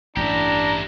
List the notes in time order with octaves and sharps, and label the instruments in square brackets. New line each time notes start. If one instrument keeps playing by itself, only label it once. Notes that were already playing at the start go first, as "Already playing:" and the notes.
[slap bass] A1 G2 [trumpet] D4 [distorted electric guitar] E4 G4 [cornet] A#5